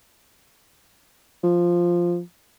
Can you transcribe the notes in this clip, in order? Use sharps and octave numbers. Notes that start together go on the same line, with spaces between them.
F3